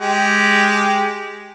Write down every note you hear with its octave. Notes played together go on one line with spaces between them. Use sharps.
G#3 G4